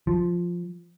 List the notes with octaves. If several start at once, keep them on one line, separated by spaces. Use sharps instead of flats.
F3